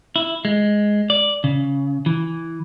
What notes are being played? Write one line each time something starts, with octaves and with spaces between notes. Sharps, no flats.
E4
G#3
D5
C#3
E3